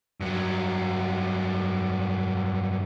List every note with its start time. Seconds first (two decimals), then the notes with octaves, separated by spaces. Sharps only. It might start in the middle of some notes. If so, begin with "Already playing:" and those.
0.20 G2 F#3